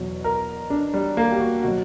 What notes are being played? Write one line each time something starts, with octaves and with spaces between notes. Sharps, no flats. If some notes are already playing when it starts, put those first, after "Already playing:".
Already playing: E2 B2 F#3
A#4
D4
G3
A#3
G4
F#4
B2 F#3 F#4